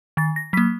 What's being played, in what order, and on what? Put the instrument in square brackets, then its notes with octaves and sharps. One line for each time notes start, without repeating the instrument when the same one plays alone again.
[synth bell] D#3 A6
A#6
F#3 B6
A#3